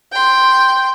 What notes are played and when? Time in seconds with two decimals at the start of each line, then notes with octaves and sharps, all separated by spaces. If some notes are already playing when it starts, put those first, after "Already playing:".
0.12 G5 C6